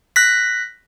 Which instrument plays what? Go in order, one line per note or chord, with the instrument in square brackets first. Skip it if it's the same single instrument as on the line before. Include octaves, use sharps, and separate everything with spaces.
[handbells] F#6 A#6 B6